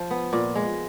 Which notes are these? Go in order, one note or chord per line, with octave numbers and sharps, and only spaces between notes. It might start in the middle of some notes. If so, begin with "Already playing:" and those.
Already playing: F3
B3
A#2
G#3